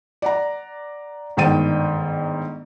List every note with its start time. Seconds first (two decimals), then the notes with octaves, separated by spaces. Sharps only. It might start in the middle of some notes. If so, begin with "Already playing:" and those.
0.22 D5 F#5 A#5
1.37 G1 G#2 D#3 G5 A6 D#7